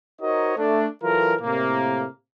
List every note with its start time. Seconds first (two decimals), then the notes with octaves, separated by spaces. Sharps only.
0.22 D#4 F#4 A#4 C5 C#5 D#5
0.57 A3 D4
1.03 E3 F#3 F4 A4 A#4
1.41 A2 C3 A#3